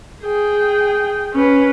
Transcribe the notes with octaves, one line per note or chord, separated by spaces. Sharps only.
G#4 G5
C#4 B4